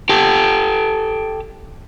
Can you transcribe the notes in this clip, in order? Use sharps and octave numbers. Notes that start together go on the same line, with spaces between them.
G4 A4